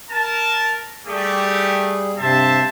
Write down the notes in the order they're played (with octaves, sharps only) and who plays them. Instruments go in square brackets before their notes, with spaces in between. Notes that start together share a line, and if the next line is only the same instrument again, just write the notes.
[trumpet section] A#4 A5
[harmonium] G3 G#4 [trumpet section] A3 G4
[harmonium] G2 C3 [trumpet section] C5 E5 A5